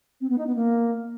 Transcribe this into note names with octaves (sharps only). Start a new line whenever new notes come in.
C4
B3
D#4
B3
A#3